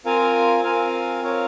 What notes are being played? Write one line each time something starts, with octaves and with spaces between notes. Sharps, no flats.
C4 F4 A#4 F5 G#5
C4 F4 A#4 F5 G#5
C4 F4 A#4 C#5 F5